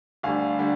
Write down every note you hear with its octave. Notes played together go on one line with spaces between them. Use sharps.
D2 D3 G3 F5 G#5
D3 G3